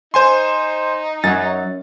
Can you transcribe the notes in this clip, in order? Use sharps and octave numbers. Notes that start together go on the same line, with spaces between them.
D#4 C5 G#5 C6
F#2 F#3 A6